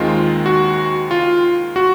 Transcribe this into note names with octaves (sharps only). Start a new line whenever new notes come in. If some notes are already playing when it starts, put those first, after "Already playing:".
Already playing: D#2 D#3 G#3 C4 F4
F#4
F4
F#4